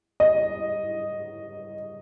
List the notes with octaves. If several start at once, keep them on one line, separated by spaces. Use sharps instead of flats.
D#5